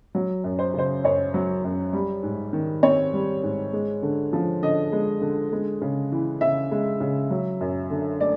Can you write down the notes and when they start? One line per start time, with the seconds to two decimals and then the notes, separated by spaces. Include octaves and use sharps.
0.15 F#3
0.44 F#2
0.59 C5
0.74 C#3 C5
1.04 F#2 C#5
1.34 F#3
1.64 F#2
1.93 G3
2.23 G#2
2.53 D#3
2.83 C4 C#5
3.13 G3
3.43 G#2
3.73 G#3
4.02 D3
4.33 F3
4.62 D3 D#5
4.92 G#3
5.21 D3
5.52 G#3
5.81 C#3
6.12 E3
6.41 C#3 E5
6.71 G#3
7.00 C#3
7.31 F#3
7.61 F#2
7.90 D3
8.21 A3 D5